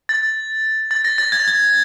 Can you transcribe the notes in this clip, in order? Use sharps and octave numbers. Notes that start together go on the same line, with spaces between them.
A6
A6
A#6
A6
G#6
A6
G#6